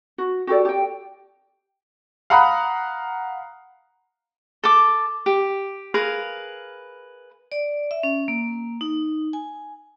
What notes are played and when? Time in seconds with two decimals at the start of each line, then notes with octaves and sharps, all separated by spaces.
0.18 F#4
0.47 F#4 G4 A4 D5
0.65 G4 G5
2.30 F5 F#5 A#5 B5 D#6 F#6
4.64 A4 D6
5.26 G4
5.94 G#4 A#4 B4 F5
7.52 D5
7.91 E5
8.03 C#4
8.28 A#3
8.81 D#4
9.33 G#5